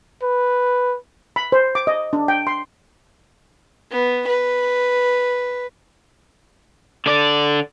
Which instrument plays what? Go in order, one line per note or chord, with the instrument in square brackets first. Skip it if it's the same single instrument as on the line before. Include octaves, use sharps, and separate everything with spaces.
[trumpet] B4
[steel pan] B5
C5
D6
D#5
D4
G5
C6
[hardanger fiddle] B3
B4
[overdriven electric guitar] D3 D5